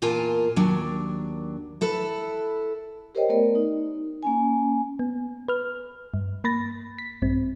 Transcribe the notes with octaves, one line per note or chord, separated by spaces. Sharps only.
E2 A#2 F4 A#4 G#5 A5
D#2 F#3 D4
E4 A4 B4
G4 A#4 C5 C#5 D#5 G5
A3 B3 A#4 D5
D#4
A#3 C#4 G#5
B3
B4 F6
G2
A#3 B5 A6 A#6
B6
A#1 G2 C4